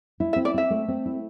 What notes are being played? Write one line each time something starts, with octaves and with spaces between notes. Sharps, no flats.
E4
E5
C4
D5
C4 E5
A3
C4
E4